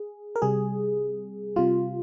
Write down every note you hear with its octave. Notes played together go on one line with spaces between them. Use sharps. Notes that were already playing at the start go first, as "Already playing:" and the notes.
Already playing: G#4
A#4
C3 G3 G#4
C3 G3 F4